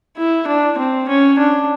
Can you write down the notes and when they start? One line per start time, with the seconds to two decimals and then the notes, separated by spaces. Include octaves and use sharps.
0.17 E4
0.47 D4
0.78 C4
1.09 C#4
1.39 D4